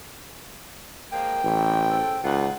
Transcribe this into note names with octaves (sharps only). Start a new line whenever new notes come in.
F3 G#3 A#3 G5
A1 E3
C#3 C4 A4
C#2 D#4 F4 F#5